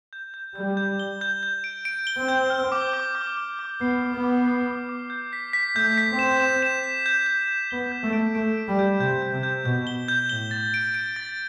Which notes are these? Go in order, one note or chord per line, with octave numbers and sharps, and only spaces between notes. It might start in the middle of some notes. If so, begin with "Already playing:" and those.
G6
G6
G3 G6
G6
G7
G6
G6
D7
D7
G7
C4
G6
F6
D6
D6
D6
D6
D6
B3 C7
D6
B3
D6
C7
D6
D6
G6
B6
B6
A3 G6
B6
C4
E7
E7
E7
B6
G6
G6
G6
B3 G7
G6
A3
D7
A3 D7
D7
G3
G6
C3 G6
G6
C3
G6
B2 G6
G7
G6
A2 G7
A6
D7
D7
A6